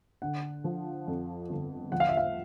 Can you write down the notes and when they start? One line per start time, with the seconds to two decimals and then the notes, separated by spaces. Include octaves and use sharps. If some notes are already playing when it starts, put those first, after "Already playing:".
0.22 D3 F#5
0.64 F3
1.08 F2
1.49 G1
1.92 F3 F#5
2.00 F5
2.09 E5
2.17 F5